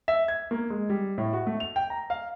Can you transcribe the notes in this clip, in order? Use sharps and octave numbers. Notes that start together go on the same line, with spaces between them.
E5
G#6
A#3
G#3
G3
A2
F#4
A3
F7
G5
A#5
F5